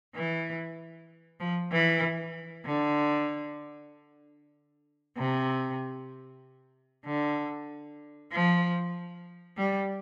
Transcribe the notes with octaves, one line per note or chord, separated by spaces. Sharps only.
E3
F3
E3
D3
C3
D3
F3
G3